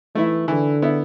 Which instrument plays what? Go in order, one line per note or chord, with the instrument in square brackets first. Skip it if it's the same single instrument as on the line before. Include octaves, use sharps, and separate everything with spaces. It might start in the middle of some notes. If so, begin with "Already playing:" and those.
[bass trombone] E3 [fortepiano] A3 E4
[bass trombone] D3 [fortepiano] E3
[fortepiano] B3 E4